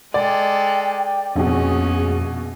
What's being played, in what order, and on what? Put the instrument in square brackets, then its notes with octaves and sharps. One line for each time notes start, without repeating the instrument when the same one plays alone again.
[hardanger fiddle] G#3 A4 [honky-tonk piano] D5 [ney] G5
[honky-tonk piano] A#1 B2 [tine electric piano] F2 [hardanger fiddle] C#4 [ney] G#4